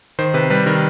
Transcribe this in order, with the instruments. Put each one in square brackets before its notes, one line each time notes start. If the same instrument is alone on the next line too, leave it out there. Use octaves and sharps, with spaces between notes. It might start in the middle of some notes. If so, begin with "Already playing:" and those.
[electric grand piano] D#3 C5
C3 B4
G3 B4
D#3 A#4